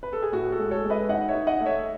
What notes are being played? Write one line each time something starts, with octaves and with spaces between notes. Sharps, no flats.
B4
A4
G#4
A2 F#4
F#4 A4
G#3
A4 C#5
G#3
B4 D#5
D#4 D#5 F#5
C#5 E5
D#4
D#5 F#5
A3
C#5 E5